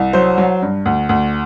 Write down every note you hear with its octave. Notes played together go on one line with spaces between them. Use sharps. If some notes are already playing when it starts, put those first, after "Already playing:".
Already playing: C2
F#3 C5
F#3
G2
D2
D2